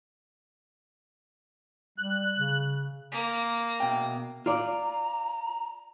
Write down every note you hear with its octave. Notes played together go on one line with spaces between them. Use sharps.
G3 F#6
C#3
A#3
B2 G5
F4 D5 A#5